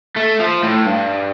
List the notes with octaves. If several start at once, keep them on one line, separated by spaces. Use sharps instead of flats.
A3
F3
A2
G2